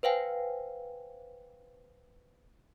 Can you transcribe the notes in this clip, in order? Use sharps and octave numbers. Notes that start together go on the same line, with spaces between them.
B4 C5 F5 G5 G#5